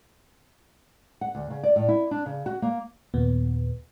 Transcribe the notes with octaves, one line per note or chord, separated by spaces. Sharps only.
F#5
D2
C#3
D5
A2
E4
D4
C#3
F#4
A#3
D#2 A#2 B3